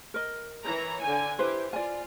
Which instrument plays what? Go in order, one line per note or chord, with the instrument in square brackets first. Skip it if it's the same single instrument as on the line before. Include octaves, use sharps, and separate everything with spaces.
[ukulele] A#4 D#5
[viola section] E3 C#5 A#5
D3 G#5
[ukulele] E4 B4 C5 [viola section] G4
[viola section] F4 [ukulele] D5 G#5